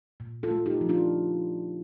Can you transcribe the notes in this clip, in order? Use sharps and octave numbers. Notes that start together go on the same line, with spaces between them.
A#2
F4 A4
A3
D#4 G4
F3
D4 F4